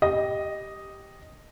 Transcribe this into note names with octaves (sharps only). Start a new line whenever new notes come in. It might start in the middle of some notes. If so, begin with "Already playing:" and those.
G4 D#5 A#6